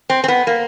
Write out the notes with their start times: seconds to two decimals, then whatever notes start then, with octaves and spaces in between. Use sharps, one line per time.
0.10 C4
0.24 C4
0.28 B3
0.47 A#3